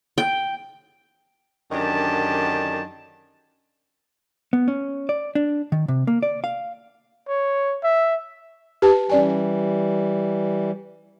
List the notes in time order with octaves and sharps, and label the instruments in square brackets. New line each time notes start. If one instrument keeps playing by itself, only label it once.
[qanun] G5
[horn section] F#2 D3 D#3 D4 G4 A5
[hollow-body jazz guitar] B3
C#4
D5
D4
D#3
C3
A#3
D5
F5
[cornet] C#5
E5
[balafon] G4 B4 A5
[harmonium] E3 G3 [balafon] C#4 D5 G#5